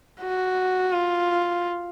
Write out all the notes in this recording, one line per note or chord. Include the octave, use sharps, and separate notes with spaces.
F#4
F4